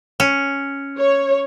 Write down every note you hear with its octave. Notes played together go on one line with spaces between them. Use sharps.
C#4
C#5